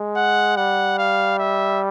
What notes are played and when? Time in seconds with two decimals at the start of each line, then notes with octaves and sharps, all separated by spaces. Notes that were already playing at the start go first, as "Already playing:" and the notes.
Already playing: G#3
0.16 F#5
0.57 G3 F#5
0.98 F5
1.39 E5